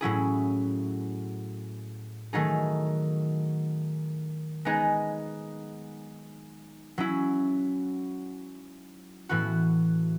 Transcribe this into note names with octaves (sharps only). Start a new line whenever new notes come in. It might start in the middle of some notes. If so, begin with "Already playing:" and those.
A2 F#3 C#4 E4 G#4
D#3 F#3 A3 D#4 G#4
G#3 B3 D#4 G#4
F#3 C#4 E4
A2 E3 B3 F#4